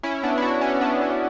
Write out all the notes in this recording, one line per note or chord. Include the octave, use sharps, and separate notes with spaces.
C#4 E4
B3 D4
E4
D4 F#4
C#4
B3 D4
C#4
B3